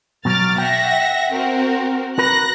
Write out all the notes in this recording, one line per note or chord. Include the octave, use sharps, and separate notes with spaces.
B2 F#3 D6 F6 A6
E5 F#5 G5 A#6
C4 F#4 A#4
F#4 A#4 B4 F#6 A#6